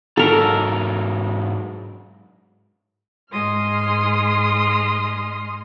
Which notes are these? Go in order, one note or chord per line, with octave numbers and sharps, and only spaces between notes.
G#2 F#3 A4 A#4 A#5
G#2 G#3 C6 D#6 F6